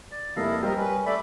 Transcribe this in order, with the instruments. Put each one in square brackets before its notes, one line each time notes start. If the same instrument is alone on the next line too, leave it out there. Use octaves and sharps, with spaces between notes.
[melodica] D5
[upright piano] F1 A#3 [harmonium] E4 [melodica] A4 D#5 F5
[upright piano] G3 [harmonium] A#4 D#5 [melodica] C5
[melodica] C#4 [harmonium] B4
[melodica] A3 E5 B5 [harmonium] A4 D5